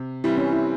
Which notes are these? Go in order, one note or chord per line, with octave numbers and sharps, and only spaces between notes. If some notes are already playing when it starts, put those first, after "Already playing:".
Already playing: C3
E3 G3 C4 E4
C#4
E4